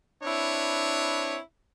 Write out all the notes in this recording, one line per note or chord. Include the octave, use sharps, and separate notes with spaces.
C4 D4 E4 B4 C#5